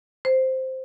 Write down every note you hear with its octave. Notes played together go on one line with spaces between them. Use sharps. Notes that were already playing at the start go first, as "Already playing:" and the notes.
C5